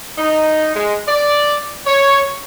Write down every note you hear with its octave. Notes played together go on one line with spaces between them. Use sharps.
D#4
G#3
D5
C#5